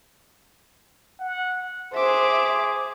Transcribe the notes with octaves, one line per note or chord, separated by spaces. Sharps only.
F#5
G#4 C5 E5 D6